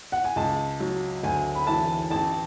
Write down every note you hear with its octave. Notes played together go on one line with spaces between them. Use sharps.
F#5
G#5
C#2 A5
F#3
D2 G#5
B5
E3 A5
A1 A5